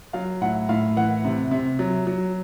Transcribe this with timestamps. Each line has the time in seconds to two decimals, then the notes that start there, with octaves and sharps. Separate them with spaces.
0.13 F#3 F5
0.41 A2 F#5
0.69 A2 F5
0.97 E3 F#5
1.25 C3
1.51 C3
1.79 F#3
2.07 F#3